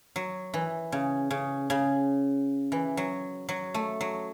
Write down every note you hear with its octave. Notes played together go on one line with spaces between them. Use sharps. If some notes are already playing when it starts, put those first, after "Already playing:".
F#3
E3
C#3
C#3
C#3
E3
F#3
F#3
A3
F#3